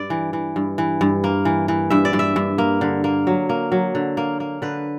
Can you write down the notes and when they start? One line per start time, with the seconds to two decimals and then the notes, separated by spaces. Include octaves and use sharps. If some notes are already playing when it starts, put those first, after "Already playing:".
Already playing: G2 D5
0.10 E3
0.33 E3
0.56 G2
0.78 E3
1.01 G2
1.24 A#3
1.45 E3
1.68 E3
1.90 G2 E5
2.05 D5
2.13 G2
2.19 E5
2.36 G2
2.58 A#3
2.81 D3
3.04 A#3
3.27 F#3
3.49 A#3
3.72 F#3
3.95 D3
4.17 A#3
4.40 A#3
4.62 D3 B4